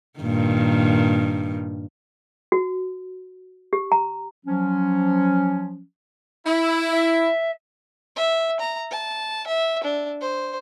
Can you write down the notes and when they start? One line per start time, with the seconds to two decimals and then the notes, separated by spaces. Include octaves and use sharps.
0.20 G2 A#2 D#3
2.52 F#4
3.73 G4
3.92 A#5
4.46 F3 F#3 C#4
6.45 E4
6.92 E5
8.16 E5
8.60 A#5
8.91 A5
9.47 E5
9.84 D4
10.21 C5